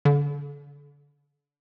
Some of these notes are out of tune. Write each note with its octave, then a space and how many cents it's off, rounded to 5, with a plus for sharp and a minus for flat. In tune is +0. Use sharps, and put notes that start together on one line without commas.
D3 -30